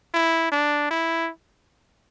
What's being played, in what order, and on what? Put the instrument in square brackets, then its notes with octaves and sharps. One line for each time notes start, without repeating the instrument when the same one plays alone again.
[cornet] E4
D4
E4